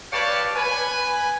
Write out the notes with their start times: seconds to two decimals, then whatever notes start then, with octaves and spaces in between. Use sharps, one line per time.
0.12 G4 B4 C#5 D5 F5 A5
0.55 B4 G#5